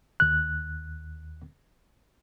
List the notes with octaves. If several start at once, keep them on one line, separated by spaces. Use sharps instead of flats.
D#2 F#6